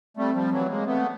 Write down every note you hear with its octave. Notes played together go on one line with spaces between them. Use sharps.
G3 A3 C4
F3 G3
E3 F#3
G#3 A#3
A3 B3 C4